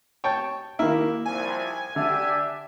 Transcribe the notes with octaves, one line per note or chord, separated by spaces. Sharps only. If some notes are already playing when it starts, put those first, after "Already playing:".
C#5 G5 A5
D#3 A#3 E4
C2 F3 G#5
D3 D4 G4 E5